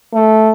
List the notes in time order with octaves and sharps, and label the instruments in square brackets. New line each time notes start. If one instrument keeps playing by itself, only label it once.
[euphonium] A3